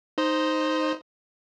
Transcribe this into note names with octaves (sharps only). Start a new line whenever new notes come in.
D#4 C5 D#5